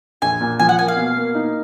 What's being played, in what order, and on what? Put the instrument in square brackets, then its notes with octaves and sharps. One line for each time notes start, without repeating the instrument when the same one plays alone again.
[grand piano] A#1 [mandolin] G#5
[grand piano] A#2
[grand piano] F3 [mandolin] G#5
[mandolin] F#5
[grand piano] A#3 [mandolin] G#5
[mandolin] F5
[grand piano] B2
A#3
D#4